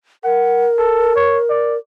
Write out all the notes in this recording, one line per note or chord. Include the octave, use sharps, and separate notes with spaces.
A#4 F#5
A4
C#5
D5